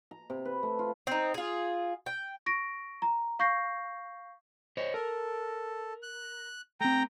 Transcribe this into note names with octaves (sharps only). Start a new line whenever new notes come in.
A#5
C3
B4
A3
F4
C4 D#4
F4 G#4
G5
C#6 A#6 D7
A#5
F5 C#6 G6 A#6 C7
C5 C#5 D#5
A4 A#4
F#6
A3 C4 G5 A#5